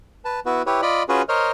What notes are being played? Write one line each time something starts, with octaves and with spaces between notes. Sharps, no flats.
B4 A5
B3 E4 F#4 B4
E4 G4 B4 C#5
F4 D5 D#5 B5
C#4 F4 F#4 G#4 B4
A#4 C5 C#5 D#5 F6